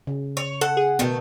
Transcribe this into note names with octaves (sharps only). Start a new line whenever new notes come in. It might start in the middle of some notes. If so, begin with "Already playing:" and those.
C#3
C#5
A4 F#5
G#4
B2 D#3 A3 B3